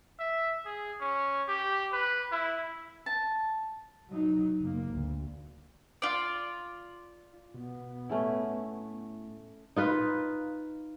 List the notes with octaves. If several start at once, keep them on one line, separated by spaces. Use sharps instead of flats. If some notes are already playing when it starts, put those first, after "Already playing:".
E5
G#4
C#4
G4
B4
E4
A5
F#3 D#4
F#1 A#3
D2
F4 D5
B2 B3
A2 A3 C#4 E4
D#4 F4 B4